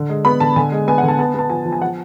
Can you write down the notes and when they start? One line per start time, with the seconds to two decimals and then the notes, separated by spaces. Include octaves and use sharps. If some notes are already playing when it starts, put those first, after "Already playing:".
Already playing: D3
0.09 G#3
0.25 B3 B5
0.40 D3 A5
0.56 D3 G#5
0.72 G#3
0.88 B3 G#5
0.98 F#5
1.03 D3
1.08 A5
1.19 B3 A5
1.34 B3 A5
1.50 F3 G#5
1.66 F3
1.73 G#5
1.82 F3 F#5